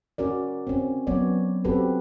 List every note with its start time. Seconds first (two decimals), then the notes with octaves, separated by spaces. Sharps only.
0.18 C#4 F#4 A#4 D5
0.67 C4 C#4
1.07 F#3 B3 C#4 C#5 D5
1.65 C4 C#4 F#4 G4 A4 B4